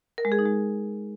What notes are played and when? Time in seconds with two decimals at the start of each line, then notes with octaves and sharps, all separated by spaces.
0.18 A#4
0.25 G#3
0.32 G#4
0.39 D#4
0.45 G#3